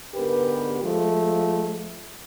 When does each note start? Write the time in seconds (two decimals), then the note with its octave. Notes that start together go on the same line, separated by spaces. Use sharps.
0.15 G#2 D3 B3 G4 A#4 B4
0.83 F3 G#3 A3